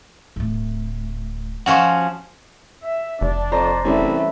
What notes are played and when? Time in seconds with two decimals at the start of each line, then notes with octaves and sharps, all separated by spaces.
0.36 D1 A2
1.66 F3 C#4 F#4 F#5 C#6
2.84 E5
3.21 F1 D4
3.52 F2 C5 D5 A#5
3.84 C2 E3 A3 C#4